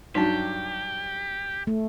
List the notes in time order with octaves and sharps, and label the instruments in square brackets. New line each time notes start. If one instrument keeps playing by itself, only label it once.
[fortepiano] G2 F#3 A5 [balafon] D#4 [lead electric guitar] G4
[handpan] A3